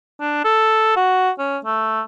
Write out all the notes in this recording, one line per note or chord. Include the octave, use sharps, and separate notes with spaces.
D4
A4
F#4
C#4
A3